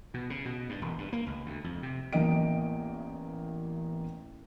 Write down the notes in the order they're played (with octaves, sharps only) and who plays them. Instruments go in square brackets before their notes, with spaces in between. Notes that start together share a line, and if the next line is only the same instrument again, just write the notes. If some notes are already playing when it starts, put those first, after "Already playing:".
[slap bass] B2
C#3
B2
G2
E1
G2
A#3
C#2
D2
F2
C3
[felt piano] A1 E2 A#3 D#5 G5 D7